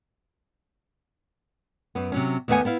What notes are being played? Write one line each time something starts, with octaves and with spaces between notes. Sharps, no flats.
F#2 B3
C3 F#3 C#4
D#2 A3 B3 D#5 F#5 G#5
B3 E4 F5